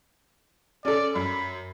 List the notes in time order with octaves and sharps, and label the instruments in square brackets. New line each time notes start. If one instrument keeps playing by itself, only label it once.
[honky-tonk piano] C#4 A4 [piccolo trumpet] D5
[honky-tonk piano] F#2 [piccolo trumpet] B5